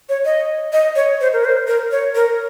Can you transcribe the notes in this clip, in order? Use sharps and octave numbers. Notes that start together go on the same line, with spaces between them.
C#5
D#5
D#5
C#5
C5
A#4
C5
A#4
C#5
A#4